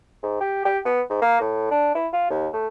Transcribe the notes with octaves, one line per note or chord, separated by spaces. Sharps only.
G#2
G4
G4
B3
G#2
A#3
A2
D4
E4
F4
D#2
A3